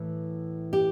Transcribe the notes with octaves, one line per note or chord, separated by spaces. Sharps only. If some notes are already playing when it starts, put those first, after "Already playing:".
Already playing: A2 E3
G4